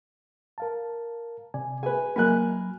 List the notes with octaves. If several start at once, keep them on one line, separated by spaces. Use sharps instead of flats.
A#4 F5 A5
C3 D5 G#5
G#4 B4 G#5
F#3 A#3 G#5 B5 F#6